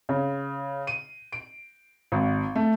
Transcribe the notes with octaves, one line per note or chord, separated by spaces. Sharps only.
C#3
D#7
D7
G#1
A3